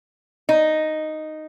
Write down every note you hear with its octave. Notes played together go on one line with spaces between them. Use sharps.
D#4